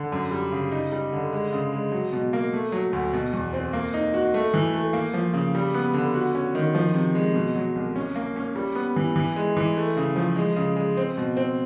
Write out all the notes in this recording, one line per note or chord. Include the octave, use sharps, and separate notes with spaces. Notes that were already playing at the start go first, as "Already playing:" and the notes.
Already playing: D3
F#2
G3
C#3
D#4
G3
D3
G#3
C#3
G#3
F#3
B2
A#3
A3
F#3
D2
B2
E2
C4
A#3
D#4
F#4
A3
E3
A3
A#3
F3
C#3
G3
B3
D3
F#4
C#4
D#3
F3
C3
G#3
B2
F#3
C2
C#4
A#3
C#4
G3
B3
E3
E3
G#3
E3
A3
C#3
F3
G#3
C#3
G#3
C4
B2
C4